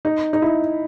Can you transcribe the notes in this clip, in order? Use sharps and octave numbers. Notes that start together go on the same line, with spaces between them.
D#4
D#4
E4